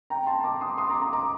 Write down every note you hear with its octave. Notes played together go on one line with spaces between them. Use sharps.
G5 A#5
A5 C6
A#5 D6
C6 D#6
C6 D#6
A#5 D6
A#5 D6
A#5 D6